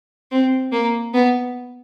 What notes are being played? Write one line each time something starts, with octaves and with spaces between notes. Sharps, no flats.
C4
A#3
B3